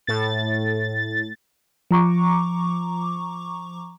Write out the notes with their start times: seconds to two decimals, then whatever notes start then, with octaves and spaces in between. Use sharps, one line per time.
0.07 A2 A6
1.91 F3 A#5 C#6 D6